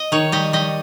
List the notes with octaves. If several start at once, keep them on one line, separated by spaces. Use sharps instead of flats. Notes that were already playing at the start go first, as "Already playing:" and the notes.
Already playing: D#5
D#3 C#5
G3 D#5
G3 D#5